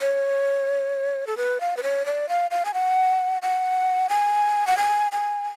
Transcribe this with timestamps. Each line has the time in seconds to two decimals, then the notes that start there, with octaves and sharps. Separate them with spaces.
0.01 C#5
1.27 A4
1.37 B4
1.61 F5
1.77 B4
1.83 C#5
2.06 D5
2.29 F5
2.51 F5
2.65 G#5
2.74 F#5
3.42 F#5
4.09 G#5
4.67 F#5
4.78 G#5
5.12 G#5